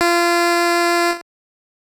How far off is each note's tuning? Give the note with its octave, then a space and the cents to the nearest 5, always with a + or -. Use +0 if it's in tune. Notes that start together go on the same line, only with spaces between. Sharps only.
F4 -25